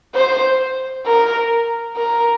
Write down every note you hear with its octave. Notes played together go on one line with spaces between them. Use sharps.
C5
A#4
A#4